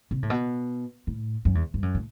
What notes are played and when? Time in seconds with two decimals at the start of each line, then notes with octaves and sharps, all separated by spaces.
0.11 C3
0.23 A2
0.30 B2
1.07 A2
1.45 F#2
1.55 E2
1.74 G2
1.83 F#2
1.95 A2